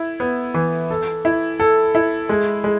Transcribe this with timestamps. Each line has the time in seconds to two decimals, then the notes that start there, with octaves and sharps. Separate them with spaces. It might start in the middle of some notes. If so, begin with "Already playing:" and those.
Already playing: E4
0.20 B3
0.54 E3
0.90 A4
1.25 E4
1.60 A4
1.95 E4
2.29 G#3
2.64 G#3